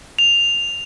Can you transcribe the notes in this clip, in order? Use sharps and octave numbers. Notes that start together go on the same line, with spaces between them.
F7